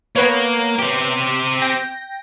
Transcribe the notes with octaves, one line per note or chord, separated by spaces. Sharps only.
A#3 B3 B4 C#5
C4 G4
G5 A#6